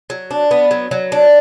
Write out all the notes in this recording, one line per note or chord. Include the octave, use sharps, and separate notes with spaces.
F#3
D4
B3
F#3
F#3
D4